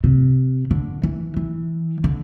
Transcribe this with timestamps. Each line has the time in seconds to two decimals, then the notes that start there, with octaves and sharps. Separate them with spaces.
0.04 C3
0.71 D3
1.03 E3
1.37 E3
2.04 D3